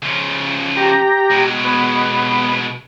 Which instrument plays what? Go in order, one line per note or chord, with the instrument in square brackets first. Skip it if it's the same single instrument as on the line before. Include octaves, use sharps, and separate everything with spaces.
[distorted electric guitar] C#3 F3
[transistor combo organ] G4 A#5
[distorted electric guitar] B2 G#3
[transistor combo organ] B3